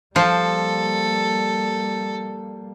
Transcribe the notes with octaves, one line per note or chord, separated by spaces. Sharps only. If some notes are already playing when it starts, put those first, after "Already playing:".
F3 G3 A#3 A4 C5